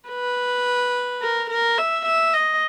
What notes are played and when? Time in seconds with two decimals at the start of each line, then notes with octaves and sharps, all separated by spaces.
0.09 B4
1.22 A#4
1.50 A#4
1.78 E5
2.05 E5
2.33 D#5